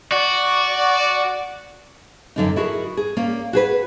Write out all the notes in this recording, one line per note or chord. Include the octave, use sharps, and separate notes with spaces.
F#4 D5
F#2 D3 D#4
E4 F#4 G#4 A#4
G#4
A#3 C#4 D5
F#4 G#4 B4